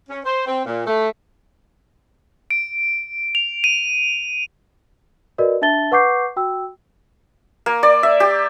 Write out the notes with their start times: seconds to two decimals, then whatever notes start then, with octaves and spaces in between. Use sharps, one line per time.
0.09 C#4
0.25 C5
0.47 C4
0.66 A#2
0.87 A3
2.51 D7
3.35 F7
3.64 D#7
5.38 F#4 A#4 B4 D5 D#5
5.62 D4 E5 A5 A6 G7
5.92 B4 F#5 C#6 D6 G6 C7
6.36 F#4 G5 E6
7.66 A#3
7.83 D5
8.03 E5
8.20 G4